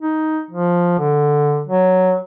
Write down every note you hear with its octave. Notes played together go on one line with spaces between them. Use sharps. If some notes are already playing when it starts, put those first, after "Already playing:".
D#4
F3
D3
F#3